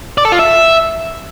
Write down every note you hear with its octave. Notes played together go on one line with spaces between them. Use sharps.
D5
A4
F4
E5